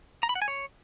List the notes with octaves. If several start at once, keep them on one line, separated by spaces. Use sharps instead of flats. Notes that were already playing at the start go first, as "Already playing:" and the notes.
A#5
B5
F#5
G#5
C#5